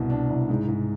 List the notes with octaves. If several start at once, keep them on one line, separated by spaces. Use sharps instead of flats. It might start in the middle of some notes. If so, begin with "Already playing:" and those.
Already playing: C2 B2
D4
C2
G#2
G#2